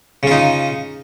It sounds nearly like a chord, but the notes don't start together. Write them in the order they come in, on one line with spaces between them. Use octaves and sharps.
C#3 F4 D#4